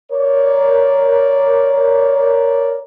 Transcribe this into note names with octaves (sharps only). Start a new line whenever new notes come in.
A#4 C#5 D5